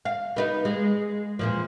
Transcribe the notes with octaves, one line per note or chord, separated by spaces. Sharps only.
F5
B3 D#4 B4
G#3
E2 A#2 F3